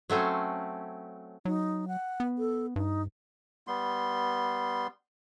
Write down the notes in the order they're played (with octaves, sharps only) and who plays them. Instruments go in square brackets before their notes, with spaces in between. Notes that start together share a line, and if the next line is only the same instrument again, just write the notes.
[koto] F#3 A3 C4 C#4
[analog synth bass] F#3 [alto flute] D#4
[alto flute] F#5
[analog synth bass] B3
[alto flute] A4
[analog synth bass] G2 [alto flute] D#4
[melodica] G3 B3 C6